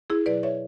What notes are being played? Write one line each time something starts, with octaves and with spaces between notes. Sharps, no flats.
E4 G#4
B2 F#3 B4 D5
C#5 E5